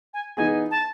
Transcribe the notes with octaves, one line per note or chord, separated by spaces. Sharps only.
G#5
E3 B3 D#4 G#4 G#5
A5